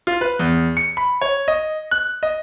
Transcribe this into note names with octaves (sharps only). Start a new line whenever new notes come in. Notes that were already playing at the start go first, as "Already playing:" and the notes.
F4
B4
E2
C#7
B5
C#5
D#5
F#6
D#5